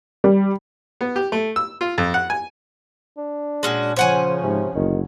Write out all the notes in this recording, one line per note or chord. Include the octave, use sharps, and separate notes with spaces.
G3
B3
G4
A3
E6
F4
F2
F#5
G#5
D4
A#2 G#3 C#4 F#4
C#3 F3 C#4 C5 C#5 F#5 G#5
G#2 C3
F#1 D2 D#3